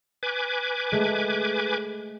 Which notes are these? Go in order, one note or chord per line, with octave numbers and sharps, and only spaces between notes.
B4 G#5 D6
G#3 A3